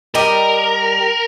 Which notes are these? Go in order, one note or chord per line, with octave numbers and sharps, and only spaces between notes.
G3 G4 A#4 D#5